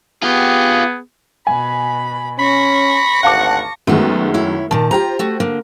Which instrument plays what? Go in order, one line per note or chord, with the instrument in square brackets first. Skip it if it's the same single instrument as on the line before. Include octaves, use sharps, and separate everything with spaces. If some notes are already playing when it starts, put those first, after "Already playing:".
[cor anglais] B3 [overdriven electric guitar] F4 G4 [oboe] G#4
[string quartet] B2 B5 [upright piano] G#5
[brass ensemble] C#4 [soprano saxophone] B5 [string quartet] C#6 A#6
[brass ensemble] G#1 D2 [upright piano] F5 A5 D6 [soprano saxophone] F#5
[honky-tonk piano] F#2 D#3 G#3 [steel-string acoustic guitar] A3 B3 F#4
[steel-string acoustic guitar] E4 C#5
[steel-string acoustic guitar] A#2 D#3 [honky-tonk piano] A5
[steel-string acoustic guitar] F4 A#5 [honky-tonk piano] G4 C5
[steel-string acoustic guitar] A3 F#4
D3 A#3